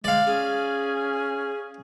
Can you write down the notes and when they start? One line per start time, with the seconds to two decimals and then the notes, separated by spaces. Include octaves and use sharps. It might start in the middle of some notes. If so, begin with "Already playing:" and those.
0.04 G#3 D5 F5
0.27 C#4 G#4